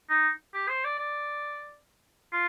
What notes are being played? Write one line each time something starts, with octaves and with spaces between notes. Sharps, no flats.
D#4
G4
C5
D5
D5
F4